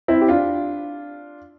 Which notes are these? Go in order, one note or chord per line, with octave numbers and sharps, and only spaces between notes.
C4 E4
G4
D4 F4